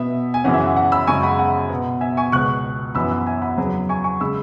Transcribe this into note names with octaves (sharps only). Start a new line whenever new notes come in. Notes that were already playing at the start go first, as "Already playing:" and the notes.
Already playing: B2 B3 E5
G#5
F#2 C#3 E3 C#4 F#5
E5
F#5
F#5
B5 E6
F#2 C#3 G#3 G#5 C#6
F#5 B5
F#5
B2 B3
E5 G#5
G#5 C#6
C#2 B2 B3 C#6 F#6
F#2 E3 B3 B5 E6
F#5
E5 G#5
F#5 B5
E2 C#3 F#3 B3
G#5 C#6
G#5 C#6
C#3 G#3 B5 E6